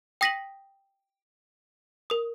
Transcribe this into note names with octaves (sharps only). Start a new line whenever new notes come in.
G5 D#6 A#6 B6 D#7 F#7
A#4 D#6